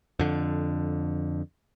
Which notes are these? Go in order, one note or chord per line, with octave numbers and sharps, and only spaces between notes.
F2 D3